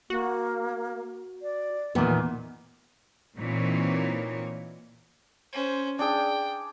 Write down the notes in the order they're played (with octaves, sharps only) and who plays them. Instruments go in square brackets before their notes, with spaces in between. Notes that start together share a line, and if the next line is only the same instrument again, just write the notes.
[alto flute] A#3 [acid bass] F#4
[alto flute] D5
[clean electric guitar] E2 A#2 [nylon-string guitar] D#3 B3
[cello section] A#2 E3 A#3 C4 D#4 C#5
[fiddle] C#4 C5
[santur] D4 G#4 [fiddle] G5